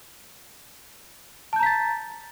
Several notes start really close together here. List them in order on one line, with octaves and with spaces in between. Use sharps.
A5 G6 A#5 B6 A6